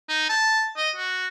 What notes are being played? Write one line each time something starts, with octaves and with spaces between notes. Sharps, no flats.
D#4
A5
D#5
F#4